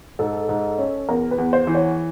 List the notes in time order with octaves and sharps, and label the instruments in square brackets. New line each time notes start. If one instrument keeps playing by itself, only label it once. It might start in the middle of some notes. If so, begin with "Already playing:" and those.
[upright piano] G#2 [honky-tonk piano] A4
[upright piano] G#2
C#4
[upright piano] E2 [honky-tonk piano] A#4
[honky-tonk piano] B4
[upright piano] E2
[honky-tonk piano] C5
[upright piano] E3
[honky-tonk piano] C#5